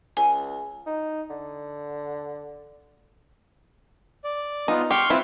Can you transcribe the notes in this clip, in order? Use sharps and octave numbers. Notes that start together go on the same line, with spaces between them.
C#2 G#5
D#4
D3
D5
B3 D#4 F4
G4 C6 C#6 F6
C4 E4 F4 B4